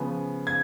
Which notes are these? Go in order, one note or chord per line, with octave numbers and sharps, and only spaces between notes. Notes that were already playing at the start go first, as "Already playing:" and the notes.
Already playing: C#3 F3 B3
G#6